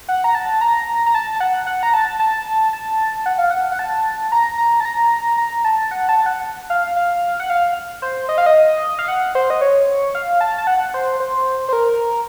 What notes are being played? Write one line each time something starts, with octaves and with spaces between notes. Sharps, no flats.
F#5
A#5
A5
A#5
A#5
A5
F#5
F#5
A#5
A5
A5
A5
A5
F#5
F5
F#5
F#5
A5
A#5
A#5
A5
A#5
A#5
A5
F#5
A5
F#5
F5
F5
F#5
F5
C5
D#5
F5
D#5
F5
F#5
C5
D#5
C#5
F5
A5
A5
F#5
C5
C5
C5
A#4